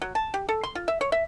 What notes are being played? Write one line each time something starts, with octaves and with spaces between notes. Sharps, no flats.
F#3
A5
G4
A4
C6
F4
E5
C#5
E5